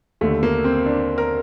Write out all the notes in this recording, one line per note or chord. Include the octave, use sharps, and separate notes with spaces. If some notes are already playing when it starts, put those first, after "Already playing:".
D#2 D3 A3
A#3
C4
D4
A#4